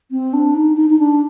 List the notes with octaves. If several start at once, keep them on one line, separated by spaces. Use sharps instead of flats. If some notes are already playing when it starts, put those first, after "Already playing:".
C4
D4
D#4
D#4
D#4
D4